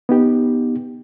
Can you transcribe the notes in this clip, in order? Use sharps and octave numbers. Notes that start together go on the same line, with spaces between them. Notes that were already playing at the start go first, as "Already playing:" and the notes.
B3 D#4 G4